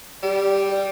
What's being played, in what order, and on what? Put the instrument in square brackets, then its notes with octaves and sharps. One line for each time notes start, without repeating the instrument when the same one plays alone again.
[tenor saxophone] G3 [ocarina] G4
[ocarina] D5